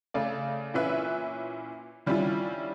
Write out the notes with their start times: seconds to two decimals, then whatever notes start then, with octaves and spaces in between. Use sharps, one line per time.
0.14 C#3 A3 D5
0.74 A#2 E3 C#4 B4 E5 F#6
2.06 D#3 G3 C#4 D4 E4 F4